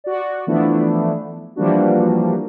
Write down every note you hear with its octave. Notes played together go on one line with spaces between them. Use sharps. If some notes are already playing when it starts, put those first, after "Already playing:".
F#4 D5
E3 F3 A3 B3 D4 E4
E3 F3 G3 A#3 D4 F#4